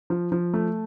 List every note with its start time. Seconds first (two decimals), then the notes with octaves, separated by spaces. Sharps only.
0.10 F3
0.32 F3
0.54 A3